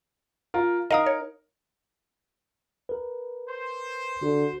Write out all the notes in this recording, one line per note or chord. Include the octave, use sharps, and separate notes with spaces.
F4 A#4
D#4 A#4 D#5 F5 D#6
C#5
A#4 B4
C5
D3 F#4